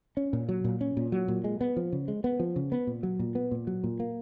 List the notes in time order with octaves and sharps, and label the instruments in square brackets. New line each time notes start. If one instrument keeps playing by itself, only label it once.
[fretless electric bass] C#4
A#2
F#3
A#2
C#4
A#2
F#3
A#2
G#3
B3
F3
C#3
G#3
B3
F3
C#3
B3
A#2
F#3
A#2
B3
A#2
F#3
A#2
A#3